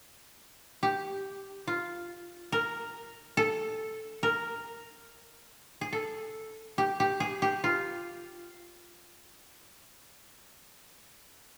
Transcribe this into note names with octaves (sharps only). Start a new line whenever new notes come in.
G4
F4
A#4
A4
A#4
G#4
A4
G4
G4
G#4
G4
F4